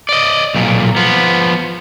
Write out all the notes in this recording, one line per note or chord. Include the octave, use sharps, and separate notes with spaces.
D5 D#5
B1 A#2
F3 B3